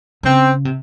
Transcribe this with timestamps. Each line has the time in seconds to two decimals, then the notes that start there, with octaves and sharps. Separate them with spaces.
0.23 C#3 C4
0.65 C3